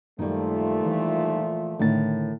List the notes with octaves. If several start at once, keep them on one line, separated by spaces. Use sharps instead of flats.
F#2 A#2 D#3 F3 G3 A3
E3
A2 D3 D#3 A#4 C#5 A6